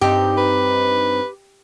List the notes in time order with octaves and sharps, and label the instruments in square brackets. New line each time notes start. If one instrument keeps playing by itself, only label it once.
[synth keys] G2 C4 D#4 [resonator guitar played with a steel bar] G4
[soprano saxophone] B4